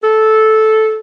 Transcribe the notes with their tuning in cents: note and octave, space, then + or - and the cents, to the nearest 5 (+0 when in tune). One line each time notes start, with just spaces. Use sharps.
A4 -10